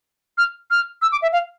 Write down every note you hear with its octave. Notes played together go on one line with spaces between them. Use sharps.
F6
F6
E6
D6
E5
F5